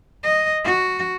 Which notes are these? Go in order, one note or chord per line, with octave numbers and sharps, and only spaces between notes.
D#5
F#4